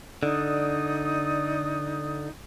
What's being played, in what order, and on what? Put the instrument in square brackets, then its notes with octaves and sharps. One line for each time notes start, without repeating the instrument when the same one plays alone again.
[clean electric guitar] D3 [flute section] D#4 D5 D#6